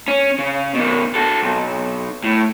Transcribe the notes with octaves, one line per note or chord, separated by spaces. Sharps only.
C#4
C#3
B2 D#3
F#4 A4
B1
A2